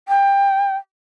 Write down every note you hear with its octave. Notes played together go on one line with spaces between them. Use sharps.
G5